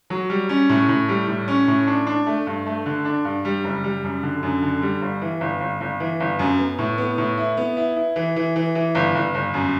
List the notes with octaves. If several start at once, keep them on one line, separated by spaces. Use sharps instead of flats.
F#3
G3
C#4
A2
A2
G3
A2
C#4
A2
D4
D4
A3
G2
A3
D3
D4
G2
G3
F#1
G3
F#2
D3
F#2
D3
G3
G1
E3
G1
G1
G1
E3
G1
F#2
B3
A2
B3
A2
E4
B3
E4
E4
E3
E3
E3
E3
G1
G1
G1
F#2